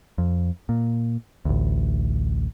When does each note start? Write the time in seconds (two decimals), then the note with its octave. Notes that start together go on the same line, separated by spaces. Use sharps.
0.18 F2
0.69 A#2
1.45 A1 D2